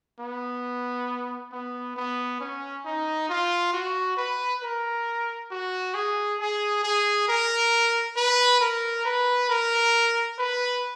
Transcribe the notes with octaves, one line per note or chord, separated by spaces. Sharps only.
B3
B3
B3
C#4
D#4
F4
F#4
B4
A#4
F#4
G#4
G#4
G#4
A#4
B4
A#4
B4
A#4
B4